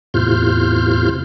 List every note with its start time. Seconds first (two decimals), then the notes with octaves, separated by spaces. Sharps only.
0.14 E2 A2 C3 F4 F6 G6